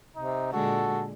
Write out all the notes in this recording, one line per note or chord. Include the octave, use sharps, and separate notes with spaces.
C3 D#4
A#2 D3 G#3 F#4 A4